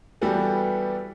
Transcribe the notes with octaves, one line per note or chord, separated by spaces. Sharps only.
E3 G3 B3 F#4 G4 A4